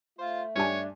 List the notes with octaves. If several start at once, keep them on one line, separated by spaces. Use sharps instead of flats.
A3 F4 C5
G2 D4 G4 C#5 G#5